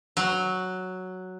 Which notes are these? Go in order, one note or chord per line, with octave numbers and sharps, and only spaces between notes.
F#3